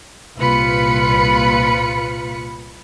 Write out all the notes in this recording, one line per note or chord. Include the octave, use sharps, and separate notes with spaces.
C2 A#2 F4 B4 B5 C#7